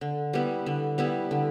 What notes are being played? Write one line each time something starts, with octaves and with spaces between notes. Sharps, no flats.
D3
G3 B3 E4
D3
G3 B3 E4
D3